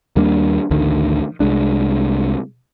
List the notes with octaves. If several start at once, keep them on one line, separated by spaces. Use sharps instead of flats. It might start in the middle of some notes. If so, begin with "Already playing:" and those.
D#2 G3 A#3 D4
A1 D2 D3 D#3
C2 G#3 D4